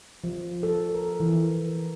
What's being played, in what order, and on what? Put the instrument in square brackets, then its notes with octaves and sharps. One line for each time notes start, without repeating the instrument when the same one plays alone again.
[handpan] F3
A4
A#4
E3
A#4